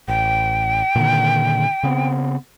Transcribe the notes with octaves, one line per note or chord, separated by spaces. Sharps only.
A1 G5
A#2 D3 D#3
C#3 B3 C4